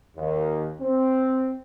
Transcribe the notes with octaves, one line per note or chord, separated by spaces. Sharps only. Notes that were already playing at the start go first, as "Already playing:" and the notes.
D#2
C4